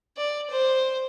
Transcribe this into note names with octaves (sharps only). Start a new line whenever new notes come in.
D5
C5